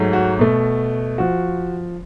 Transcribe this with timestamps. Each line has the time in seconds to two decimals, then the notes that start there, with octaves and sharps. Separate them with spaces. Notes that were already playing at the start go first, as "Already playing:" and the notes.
Already playing: G#2 F#3 A3
0.13 F#4
0.39 B2 A3
1.18 F3 F#4